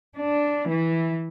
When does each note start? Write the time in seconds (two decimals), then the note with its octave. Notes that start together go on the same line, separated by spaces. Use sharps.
0.18 D4
0.72 E3